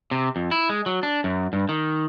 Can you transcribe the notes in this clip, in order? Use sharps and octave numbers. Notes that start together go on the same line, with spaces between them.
C3
F2
E4
G#3
F#3
D4
F#2
G2
D#3